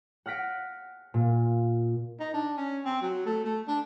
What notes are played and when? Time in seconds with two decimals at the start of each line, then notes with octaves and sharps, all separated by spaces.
0.26 F#5 F6 A#6 B6 D7
1.14 A#2
2.20 D#4
2.34 D4
2.57 C#4
2.85 C4
3.02 F#3
3.26 A3
3.44 A3
3.68 D4